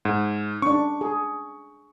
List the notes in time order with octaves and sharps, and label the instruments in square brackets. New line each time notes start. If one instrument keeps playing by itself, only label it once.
[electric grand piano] G#2
[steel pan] C#4 D4 [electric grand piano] C#6
[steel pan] G#4